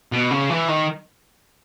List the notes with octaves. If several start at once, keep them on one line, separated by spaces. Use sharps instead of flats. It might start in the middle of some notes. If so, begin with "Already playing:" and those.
B2
C#3
E3
D#3